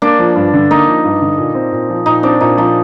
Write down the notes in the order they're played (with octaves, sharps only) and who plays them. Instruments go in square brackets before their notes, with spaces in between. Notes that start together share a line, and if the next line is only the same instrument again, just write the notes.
[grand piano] A#3 [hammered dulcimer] D4
[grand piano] F3
G2
D3
[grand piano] A#3 [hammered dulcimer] D#4
[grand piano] F3
G2
D3
A#2
C4
A#2
F3
[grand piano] A#2 [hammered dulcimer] D#4
[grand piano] C4 [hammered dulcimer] D4
[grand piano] A#2 [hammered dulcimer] D#4
[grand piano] F3 [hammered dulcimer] D#4